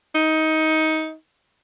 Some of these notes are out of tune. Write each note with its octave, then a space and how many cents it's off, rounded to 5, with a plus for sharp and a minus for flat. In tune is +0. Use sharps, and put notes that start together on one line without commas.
D#4 +20